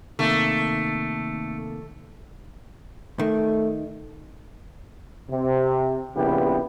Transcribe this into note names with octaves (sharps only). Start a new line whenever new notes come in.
C3 D#3 A3 A#3
D#3 A3
C3
A#1 C#3 B3 E4 G4 B4